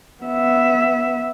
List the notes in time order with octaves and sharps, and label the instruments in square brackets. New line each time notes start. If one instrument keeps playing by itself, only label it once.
[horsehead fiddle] B3 E5